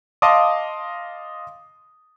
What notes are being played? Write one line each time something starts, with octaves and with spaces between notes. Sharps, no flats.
D#5 F5 A5 C6 D6 D#6